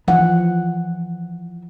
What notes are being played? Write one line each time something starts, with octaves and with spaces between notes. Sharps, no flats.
E3 F3 F#5